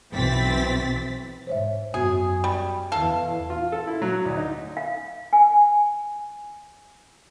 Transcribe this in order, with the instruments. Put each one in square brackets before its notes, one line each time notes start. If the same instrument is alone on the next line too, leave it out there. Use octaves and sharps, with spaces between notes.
[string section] B1 E3 C4 A6 B6
[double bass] G#2 [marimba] C5 C#5 E5
[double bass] F#2 [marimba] B3 F#4 D#6 [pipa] G#4
[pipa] G3
[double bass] E2 E3 [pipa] A4 F5
[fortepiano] F4
A4
E4
F#3
D2
D#4
[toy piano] F5
G#5